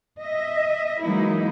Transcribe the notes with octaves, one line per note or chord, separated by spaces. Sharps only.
D#5 E5
E3 F#3 G#3 A#3 D#4 E4